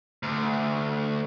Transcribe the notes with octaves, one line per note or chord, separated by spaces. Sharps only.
D2